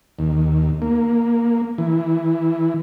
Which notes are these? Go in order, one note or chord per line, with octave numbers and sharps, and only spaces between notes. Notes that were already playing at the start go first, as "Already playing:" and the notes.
D#2
A#3
E3